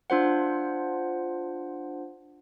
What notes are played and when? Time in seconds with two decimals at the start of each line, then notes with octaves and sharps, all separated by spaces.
0.10 D4 F4 C5 F#5